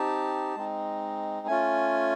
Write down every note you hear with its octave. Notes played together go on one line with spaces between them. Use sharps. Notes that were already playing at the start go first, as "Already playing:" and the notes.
Already playing: C4 D#4 G4 A5
G#3 C4 D#4
A3 C#4 F4 G#5